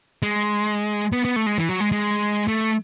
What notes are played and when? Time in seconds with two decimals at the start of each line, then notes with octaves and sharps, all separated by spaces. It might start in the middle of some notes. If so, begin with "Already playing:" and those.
0.23 G#3
1.12 B3
1.25 B3
1.36 A3
1.46 G#3
1.58 E3
1.69 F#3
1.81 G#3
1.92 G#3
2.48 A3